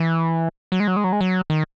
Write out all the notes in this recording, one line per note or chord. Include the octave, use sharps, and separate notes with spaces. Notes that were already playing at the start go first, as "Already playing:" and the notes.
Already playing: E3
F#3
G#3
F#3
G#3
F#3
G#3
F#3
D#3